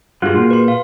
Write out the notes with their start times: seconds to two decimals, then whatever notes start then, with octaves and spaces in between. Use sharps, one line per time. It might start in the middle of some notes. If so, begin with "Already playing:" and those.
0.22 G2 F4 F#4 G#4 F#5
0.35 A#2 F4
0.51 B4 C6
0.68 F5 C6